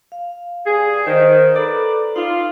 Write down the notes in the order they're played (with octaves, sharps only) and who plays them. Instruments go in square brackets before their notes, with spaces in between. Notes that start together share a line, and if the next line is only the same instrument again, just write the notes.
[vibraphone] F5
[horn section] G2 G#4
[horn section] D#3 [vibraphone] C5 D#6
[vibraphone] A4 A#5 [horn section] B4 D5
[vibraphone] D#4 [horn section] F4